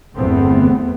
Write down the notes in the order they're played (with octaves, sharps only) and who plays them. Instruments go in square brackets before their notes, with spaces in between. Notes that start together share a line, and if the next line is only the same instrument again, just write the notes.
[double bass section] G1 E2 A3 B3 C4